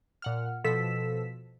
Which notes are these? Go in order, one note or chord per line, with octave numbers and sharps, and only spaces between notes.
A#2 F#5 F6
B2 F3 A4 E6 B6 E7